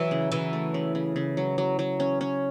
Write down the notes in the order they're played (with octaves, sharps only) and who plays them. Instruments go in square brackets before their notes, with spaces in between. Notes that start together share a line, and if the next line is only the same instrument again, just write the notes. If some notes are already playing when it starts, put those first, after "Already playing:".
Already playing: [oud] E3 [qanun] F#3
[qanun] C#3
[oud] E3 [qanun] F#3
[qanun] A3
C#3
C#3
C#3
F#3
F#3
F#3
C#4
C#4